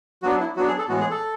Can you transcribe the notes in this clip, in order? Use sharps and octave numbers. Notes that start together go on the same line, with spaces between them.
F#3 B3 D4 F#4
E4
F#3 B3 D4 F#4
G#4
A4
A2 E3 G#3 B3 F#4
G#4
A4